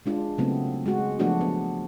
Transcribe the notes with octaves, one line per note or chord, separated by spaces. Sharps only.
G#3 D4 F4
C#3 F#3 A3 B3 C4
G#3 F#4
F3 F#3 A3 B3 D4 F#4
B3